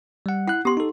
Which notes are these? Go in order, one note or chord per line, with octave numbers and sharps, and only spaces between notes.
G3 F#5
E4 F#5 F#6
B3 G4 C6
D#4 A4